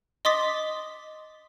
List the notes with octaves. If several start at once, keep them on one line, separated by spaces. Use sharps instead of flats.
D#5 C6 D6 D#6 A6 B6